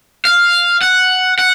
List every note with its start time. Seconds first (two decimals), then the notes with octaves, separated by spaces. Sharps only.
0.25 F5
0.81 F#5
1.39 F#5